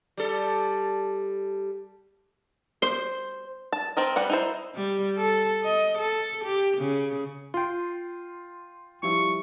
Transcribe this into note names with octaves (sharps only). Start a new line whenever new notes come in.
G3 A4
C5
A5
C4 A#4 D#5
G3 B4 F#5
D#4 E4 C5
G3
A4
D#5
A4
G4
C#3
F4 G5 C6
F3 G3 E4 C#6